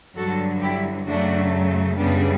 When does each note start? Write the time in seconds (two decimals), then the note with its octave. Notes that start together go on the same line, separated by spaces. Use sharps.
0.16 G2 D3 F#3 F#4 A4
0.62 E4 G4
1.07 F#2 C#3 F#3 A3 D4 F#4
1.98 F#2 C#3 G3 B3 D4